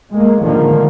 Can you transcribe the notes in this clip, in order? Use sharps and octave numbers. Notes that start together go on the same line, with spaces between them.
G#3 A#3
A2 D3 D#3 F3 G#3 A#3